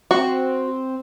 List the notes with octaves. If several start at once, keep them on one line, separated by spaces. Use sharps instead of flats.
C4 F#4